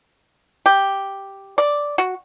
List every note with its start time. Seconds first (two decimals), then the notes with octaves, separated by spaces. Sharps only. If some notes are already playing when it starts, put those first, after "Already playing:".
0.66 G4
1.58 D5
1.98 F#4